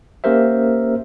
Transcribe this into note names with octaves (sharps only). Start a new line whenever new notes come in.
A#3 C#4 G4 A#4 C5 E5